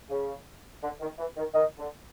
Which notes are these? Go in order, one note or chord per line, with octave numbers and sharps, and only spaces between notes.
C#3
D3
D#3
E3
D#3
D#3 D#5
D3